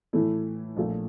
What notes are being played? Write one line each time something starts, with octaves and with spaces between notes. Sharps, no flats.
A2 E3 A3 E4
A#1 A#2 A3